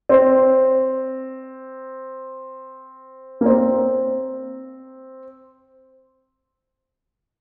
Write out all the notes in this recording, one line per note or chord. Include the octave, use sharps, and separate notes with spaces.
C4
A#3
C4